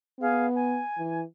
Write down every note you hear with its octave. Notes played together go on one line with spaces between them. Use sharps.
B3 G#4 F5
G#5
E3